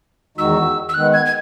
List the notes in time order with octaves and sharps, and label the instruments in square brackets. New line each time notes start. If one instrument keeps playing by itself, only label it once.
[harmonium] E2 D#3 G#3 D#4 F#4 [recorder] E6
[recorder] E6
[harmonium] D#3 G#3 B3 [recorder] F#6
[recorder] G#6
G#6